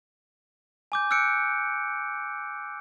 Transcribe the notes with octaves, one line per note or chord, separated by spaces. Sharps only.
G#5 D6 G6
E6 F#6 G6 C#7 D7